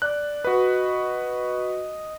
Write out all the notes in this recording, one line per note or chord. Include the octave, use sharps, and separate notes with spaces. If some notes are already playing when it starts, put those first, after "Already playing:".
D5 F#6
F#4 B4 D#5